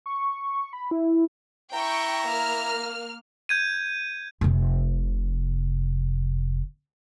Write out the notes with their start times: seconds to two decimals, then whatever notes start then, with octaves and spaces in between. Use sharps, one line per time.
0.06 C#6
0.73 B5
0.91 E4
1.74 E4 G5 A#5 C#6
2.27 A#3 F6
3.49 G6 G#6 D#7
4.41 F1 C3